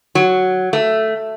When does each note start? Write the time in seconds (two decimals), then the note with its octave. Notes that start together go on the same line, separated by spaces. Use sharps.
0.15 F#3
0.73 A3